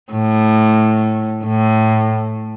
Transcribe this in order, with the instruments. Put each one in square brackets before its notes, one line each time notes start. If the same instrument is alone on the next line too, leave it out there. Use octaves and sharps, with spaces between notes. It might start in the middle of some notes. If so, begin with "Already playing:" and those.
[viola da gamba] A2
A2